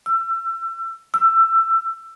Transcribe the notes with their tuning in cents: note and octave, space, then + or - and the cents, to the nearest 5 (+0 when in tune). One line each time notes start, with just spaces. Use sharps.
E6 +25
E6 +20